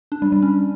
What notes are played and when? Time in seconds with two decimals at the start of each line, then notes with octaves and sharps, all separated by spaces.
0.12 D4
0.22 G3
0.32 G3
0.42 C#4